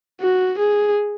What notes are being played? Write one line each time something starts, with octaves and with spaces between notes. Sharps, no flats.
F#4
G#4